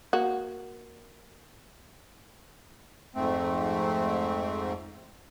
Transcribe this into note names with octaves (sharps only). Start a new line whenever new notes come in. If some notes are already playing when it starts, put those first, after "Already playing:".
A#3 F#4
F2 G#2 A3 C4